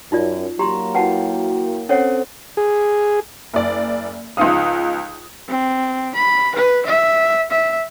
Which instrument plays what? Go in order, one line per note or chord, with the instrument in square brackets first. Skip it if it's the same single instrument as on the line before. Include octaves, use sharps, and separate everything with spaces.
[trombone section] F#2 [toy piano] D#4 F4 D5
[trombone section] F#3 A#3 [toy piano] G4 C6 [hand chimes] A#5
[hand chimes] E4 F#4 G5 [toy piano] B4 F#5 A5
[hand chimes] C4 A4 C5 [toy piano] C#4 C#5 F#5
[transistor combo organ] G#4
[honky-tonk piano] F#1 D5
C#2 F3 D#4 F5 D#6
[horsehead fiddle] C4
B5
B4
E5
E5